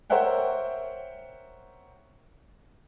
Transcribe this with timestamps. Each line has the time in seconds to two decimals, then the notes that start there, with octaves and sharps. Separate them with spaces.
0.10 A#4 C5 C#5 E5 F#5 G5